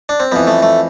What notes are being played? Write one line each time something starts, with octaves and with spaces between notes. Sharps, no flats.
D4
C4
F2 E3 B3
A3
A3